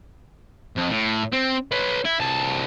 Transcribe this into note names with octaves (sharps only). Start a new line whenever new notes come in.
F2
A2
C4
B4 C#5
E4
C2 A5